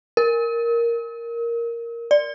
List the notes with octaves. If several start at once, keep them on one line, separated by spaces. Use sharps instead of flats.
A#4
D5